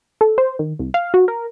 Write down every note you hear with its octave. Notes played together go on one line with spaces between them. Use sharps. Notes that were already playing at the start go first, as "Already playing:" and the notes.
A4
C5
D#3
C2
F5
F#4
A#4